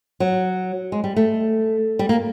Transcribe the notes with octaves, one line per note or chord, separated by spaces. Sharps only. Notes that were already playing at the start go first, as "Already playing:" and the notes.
F#3
G#3
G3
A3
G3
A#3